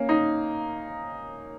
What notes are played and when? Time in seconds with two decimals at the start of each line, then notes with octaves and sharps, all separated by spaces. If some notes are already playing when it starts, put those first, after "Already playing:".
Already playing: A#3 C#4
0.09 D#4